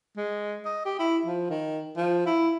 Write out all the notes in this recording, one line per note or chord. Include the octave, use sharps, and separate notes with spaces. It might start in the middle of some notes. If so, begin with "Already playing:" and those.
G#3
D#5
G4
E4
F3
D#3
F3
E4